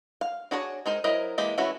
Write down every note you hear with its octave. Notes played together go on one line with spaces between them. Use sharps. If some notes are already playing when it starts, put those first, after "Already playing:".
F5
D4 F#4 G#4 A#4 C#5
G#3 D#4 A#4 C5
F#3 E4 A#4 C5 D#5
E3 G#3 A#3 G4
E3 A3 C#4 E4 F#4